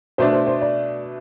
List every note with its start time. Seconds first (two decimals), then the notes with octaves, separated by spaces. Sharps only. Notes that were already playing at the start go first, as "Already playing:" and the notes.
0.18 B2 A3 D4 C5
0.33 C5
0.47 C5
0.61 D5